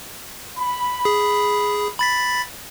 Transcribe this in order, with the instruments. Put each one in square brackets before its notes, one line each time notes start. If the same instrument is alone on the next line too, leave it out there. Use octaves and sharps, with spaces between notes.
[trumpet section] B5
[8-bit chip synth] G#4
B5 A6 B6